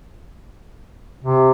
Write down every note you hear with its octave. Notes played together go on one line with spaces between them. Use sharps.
C3